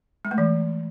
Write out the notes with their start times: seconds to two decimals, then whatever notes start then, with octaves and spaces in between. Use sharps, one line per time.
0.25 G#3
0.31 A3
0.38 E3